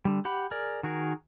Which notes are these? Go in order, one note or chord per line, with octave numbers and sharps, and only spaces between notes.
D3 G3
G4 F#5 B5
G#4 A#4 D5
D#3 F#4 G#4 A#4